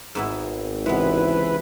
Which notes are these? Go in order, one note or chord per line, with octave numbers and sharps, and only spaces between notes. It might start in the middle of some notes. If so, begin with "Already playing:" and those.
G#1 G#2 B3 E4
C#2 C3 E3 G#3 B3 E4 B4